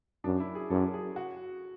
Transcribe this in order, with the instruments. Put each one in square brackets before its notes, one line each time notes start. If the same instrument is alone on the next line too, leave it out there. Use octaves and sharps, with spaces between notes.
[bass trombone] F#2 [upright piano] D4
[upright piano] E4
G#4
[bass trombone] F#2 [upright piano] A4
[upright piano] G#4
F#4